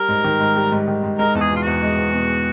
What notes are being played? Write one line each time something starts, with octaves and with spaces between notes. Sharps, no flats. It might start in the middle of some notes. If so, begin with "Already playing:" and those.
Already playing: G3 A#4
G#2
D#3
G#2
G3
G#2
D#3
G#2
G#3 A#4
E2 A4
G#4
B2 F4
E2 F#4
G#3
E2
B2